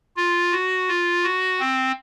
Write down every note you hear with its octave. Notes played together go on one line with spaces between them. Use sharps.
F4
F#4
F4
F#4
C4